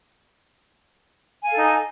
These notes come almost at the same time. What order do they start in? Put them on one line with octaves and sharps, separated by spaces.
G#5 F5 A4 D#4